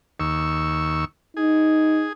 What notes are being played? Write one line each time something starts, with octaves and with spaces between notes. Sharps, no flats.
D#2 C#6 E6
D#4 G#4